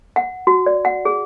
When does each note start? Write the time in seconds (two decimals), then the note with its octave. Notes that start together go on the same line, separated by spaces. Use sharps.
0.16 F#5
0.47 F#4
0.66 D5
0.85 F#5
1.05 G#4